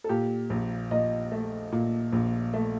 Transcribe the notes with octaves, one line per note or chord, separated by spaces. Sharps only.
A4
A#2 G4
A#1
A#2 D#5
A3
A#2
A#1
A3